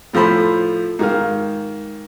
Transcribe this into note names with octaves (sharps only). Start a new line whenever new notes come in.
A2 F3 A4 C5 B5
G#2 D#3 F5